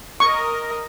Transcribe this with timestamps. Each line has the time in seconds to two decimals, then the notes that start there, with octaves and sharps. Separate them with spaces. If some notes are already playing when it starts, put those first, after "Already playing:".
0.20 A#4 D#5 C#6